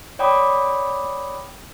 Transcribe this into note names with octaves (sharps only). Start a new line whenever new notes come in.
C#5 D5 G5 B5 D6 D#6